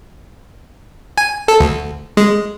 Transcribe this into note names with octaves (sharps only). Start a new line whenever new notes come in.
G#5
A4
D2
G#3